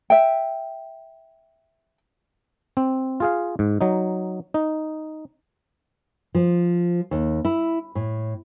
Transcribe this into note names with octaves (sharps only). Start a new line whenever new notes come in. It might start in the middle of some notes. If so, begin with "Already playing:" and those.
E5 G5
C4
F4 G#4 F5
G#2
F#3 D#4
D#4
F3
D#2
E4
A2